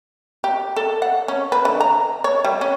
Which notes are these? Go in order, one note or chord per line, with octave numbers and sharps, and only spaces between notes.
G4
A4
F#5
C#4
B4
D3
A#5
C#5
G3
C#4